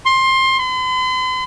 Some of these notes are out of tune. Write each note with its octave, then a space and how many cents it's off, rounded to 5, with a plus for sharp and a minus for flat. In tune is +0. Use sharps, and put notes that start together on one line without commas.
C6 +20
C6 -45